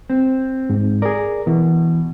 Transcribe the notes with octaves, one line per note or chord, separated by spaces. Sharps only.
C4
G#2
G#4 A#4 D5
B2 E3